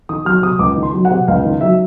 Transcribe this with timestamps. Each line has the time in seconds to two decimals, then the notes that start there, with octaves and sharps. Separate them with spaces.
0.09 D#3 D#6
0.25 F#3 F6
0.42 C3 D#6
0.59 C#2 D6
0.76 D#3
0.83 C6
0.93 F#3
1.05 F#5
1.11 C3
1.28 C#2 F5
1.45 D#3
1.61 F#3 E5